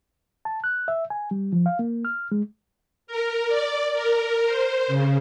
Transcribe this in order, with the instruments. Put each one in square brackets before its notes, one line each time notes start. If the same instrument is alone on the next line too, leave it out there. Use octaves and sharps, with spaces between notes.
[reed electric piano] A5
F#6
E5
G#5
G3
F3
F5
A#3
F6
G#3
[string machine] A#4
D5
A#4
C5
C#3